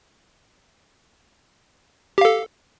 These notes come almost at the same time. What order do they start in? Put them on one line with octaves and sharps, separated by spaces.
G4 F5 A4